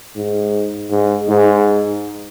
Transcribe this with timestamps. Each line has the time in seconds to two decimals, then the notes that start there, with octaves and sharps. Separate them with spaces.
0.16 G#2
0.91 G#2
1.28 G#2